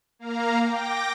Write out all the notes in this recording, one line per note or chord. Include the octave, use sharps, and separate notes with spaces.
A#3 F5 A#5
G5 D6 A#6